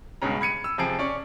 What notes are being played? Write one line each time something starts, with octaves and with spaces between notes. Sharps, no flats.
C#2 G2 B2 G#3 C#4 A#5
B5 G#6 C#7 D#7
E6
F2 C3 F3 G#4 A5 D7
C#4 D5 C#6